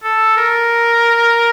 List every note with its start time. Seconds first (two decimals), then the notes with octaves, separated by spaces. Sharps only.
0.04 A4
0.37 A#4